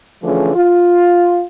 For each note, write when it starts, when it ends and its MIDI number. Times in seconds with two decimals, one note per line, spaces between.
0.24 0.54 50
0.24 0.54 52
0.24 0.54 53
0.24 0.54 57
0.24 0.54 61
0.24 0.54 68
0.55 1.45 65